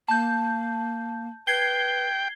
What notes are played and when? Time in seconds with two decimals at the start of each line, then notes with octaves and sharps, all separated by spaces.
0.08 A#3 A5 G6
1.47 B4 G5 G#6 C7 G7